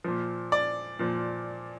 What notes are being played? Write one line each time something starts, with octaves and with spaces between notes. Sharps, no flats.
A#2 F3
D5
A#2 F3